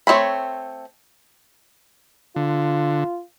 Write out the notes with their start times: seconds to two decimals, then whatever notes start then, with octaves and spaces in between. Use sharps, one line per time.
0.07 A3 C4 E4 C#5 B5
2.36 D3 F4